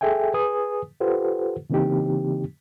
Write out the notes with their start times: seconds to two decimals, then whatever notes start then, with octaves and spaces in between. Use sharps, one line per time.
0.01 G#4 A4 E5 G5 G#5
0.34 G#4 B4 G#5 D#6
1.00 F4 G4 A4 B4 C5 F#5
1.70 C#3 E3 A#3 C4 D#4 G4